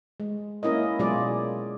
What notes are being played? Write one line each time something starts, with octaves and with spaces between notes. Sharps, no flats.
G#3
A#3 C#4 E4 A#4 D#5
B2 F#3 G#3 F4 G#4 D5